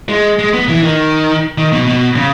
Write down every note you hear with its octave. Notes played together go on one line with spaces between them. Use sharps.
G#3
G#3
B3
E3
D#3
D#3
B2
B2
C#3